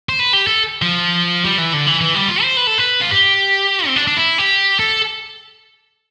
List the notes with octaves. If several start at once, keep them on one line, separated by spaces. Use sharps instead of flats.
C5
B4
G4
A4
F3
G3
E3
D3
E3
E3
G3
F4
C5
B4
A4
B4
F4
G4
C4
D4
D4
E4
G4
A4